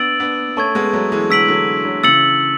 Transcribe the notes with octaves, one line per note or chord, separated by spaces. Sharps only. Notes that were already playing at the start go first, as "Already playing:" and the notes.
Already playing: B3 D4 E6 A6 D7 F#7
B3 D4
A3 C#4 A5 C#6 G#6
G#3 B3
F#3 A3
E3 G#3
D3 F#3 E6 B6 D7 F#7
D3 F#3
D3 F#3
C#3 E3 E6 A6 C#7 F#7